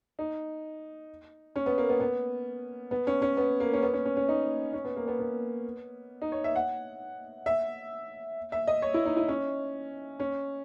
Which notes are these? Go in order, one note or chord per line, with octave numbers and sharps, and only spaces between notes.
D#4
C#4
B3
A#3
B3
B3
B3
C#4
C#4
B3
A#3
C#4
B3
C#4
C#4
C#4
D#4
C#4
B3
A#3
B3
B3
D#4
C#5
E5
F#5
E5
E5
D#5
C#5
E4
D#4
E4
C#4
C#4